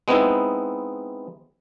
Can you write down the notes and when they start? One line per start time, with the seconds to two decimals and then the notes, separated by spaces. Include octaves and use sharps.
0.08 G#3 B3 C4 D#4 E4